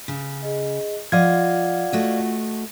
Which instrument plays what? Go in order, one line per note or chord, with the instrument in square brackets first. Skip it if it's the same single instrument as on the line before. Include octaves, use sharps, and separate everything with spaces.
[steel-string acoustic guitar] C#3
[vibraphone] G#4 D#5
[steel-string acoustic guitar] F3 D#5 [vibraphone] F4 F#5 [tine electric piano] D5 F5 G#6
[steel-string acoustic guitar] A3 F#4 D#5